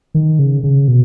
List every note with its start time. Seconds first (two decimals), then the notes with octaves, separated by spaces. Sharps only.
0.14 D#3
0.39 C#3
0.63 C#3
0.88 B2